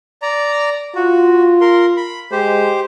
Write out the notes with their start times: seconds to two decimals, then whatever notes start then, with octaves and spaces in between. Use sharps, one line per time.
0.22 D5 A#5
0.95 F4 F#4
1.61 A#4 C6
1.97 B5
2.32 G#3 G4 C5